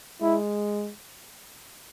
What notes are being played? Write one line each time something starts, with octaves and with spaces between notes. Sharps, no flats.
G#3 E4